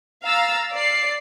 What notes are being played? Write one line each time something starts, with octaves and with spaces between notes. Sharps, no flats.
F5 A#5 E6 A6
D5 C7